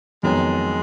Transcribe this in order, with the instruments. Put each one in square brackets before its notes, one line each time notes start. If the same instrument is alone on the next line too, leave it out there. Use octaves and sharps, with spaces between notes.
[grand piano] F2 D#3 F#3 B3 [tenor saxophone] G#3